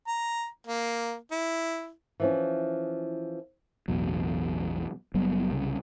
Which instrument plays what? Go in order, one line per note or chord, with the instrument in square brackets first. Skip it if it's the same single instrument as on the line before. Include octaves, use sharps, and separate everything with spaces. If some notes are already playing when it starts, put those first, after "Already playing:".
[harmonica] A#5
A#3
E4
[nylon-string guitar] E3 F3 C#4
[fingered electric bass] A1 E2 B2 F#3
F#1 F#3 G3 B3
C2 C#3